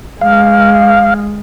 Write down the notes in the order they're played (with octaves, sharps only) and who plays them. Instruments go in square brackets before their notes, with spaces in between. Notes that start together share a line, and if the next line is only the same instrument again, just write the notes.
[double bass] G#3 [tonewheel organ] F5